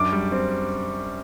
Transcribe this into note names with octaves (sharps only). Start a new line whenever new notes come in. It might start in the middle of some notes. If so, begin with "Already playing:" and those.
Already playing: F#2 D4 D6
G3
C4